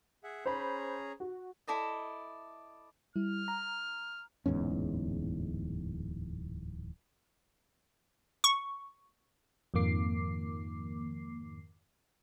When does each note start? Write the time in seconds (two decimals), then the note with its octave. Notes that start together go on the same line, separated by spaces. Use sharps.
0.24 G#4 E5 F#5
0.46 C#4 G#4 C5 A#5 B5
1.20 F#4
1.67 E4 A4 D5 D#5
3.16 G3 E4 F6
3.48 A#5
4.46 D1 E2 G#2 C#4
8.44 C#6
9.74 F2 G#2 D#3 A#3 D6 C7